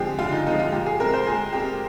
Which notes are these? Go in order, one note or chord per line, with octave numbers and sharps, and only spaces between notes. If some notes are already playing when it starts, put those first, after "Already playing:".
Already playing: D3 F3 G#3 C4 G4 G#4
D3 F4
D#4
F3 G#3 C4 D#4
F4
A#2 G4
G#4
G#3 C4 A#4
C5
A#2 G#4
G#3 C4 G4